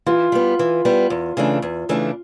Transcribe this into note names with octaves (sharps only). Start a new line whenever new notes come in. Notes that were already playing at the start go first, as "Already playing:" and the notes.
E3 F4
G3 B3
E3
G3 B3
E2
C#3 E3 A3 D4
E2
C#3 E3 A3 D4